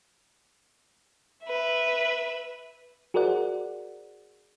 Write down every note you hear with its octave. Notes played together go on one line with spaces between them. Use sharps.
B4 E5
F#4 G#4 A#4 C5 D5 F#5